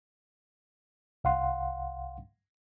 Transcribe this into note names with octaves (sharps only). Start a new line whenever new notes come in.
C2 F5 F#5 C6